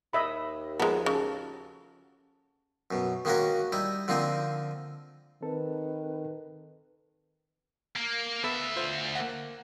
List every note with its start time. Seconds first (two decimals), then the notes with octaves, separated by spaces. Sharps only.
0.13 D#2 D#5 E5 B5
0.80 F3 G#3 A#3 B3 G#4
1.06 C#3 F#4 A4
2.91 F#2 B2
3.25 D#3 G#3 A#3 C#4 F#4 A#4
3.72 G3 D#4 E4
4.08 D3 F3 A#3 C4 D#4
5.42 D#3 C4 A4 B4
7.96 A#3
8.44 D2 B3 A4 E5 B5
8.76 F4 C5
9.15 A#3 F#5